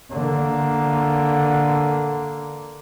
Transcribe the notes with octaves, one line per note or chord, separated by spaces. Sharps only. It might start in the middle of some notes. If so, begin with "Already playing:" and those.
D3 A#3